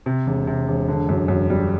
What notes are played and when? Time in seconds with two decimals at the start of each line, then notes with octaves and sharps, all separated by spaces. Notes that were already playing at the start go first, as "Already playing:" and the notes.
0.06 C3
0.27 E1
0.47 C3
0.68 E1
0.89 D3
1.09 F#2
1.28 F#2
1.50 G3